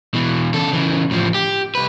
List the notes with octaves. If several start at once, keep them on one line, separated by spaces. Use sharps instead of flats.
B2 E3
C#3 A4
C#3 E3
A2 F3
G4
C2 B4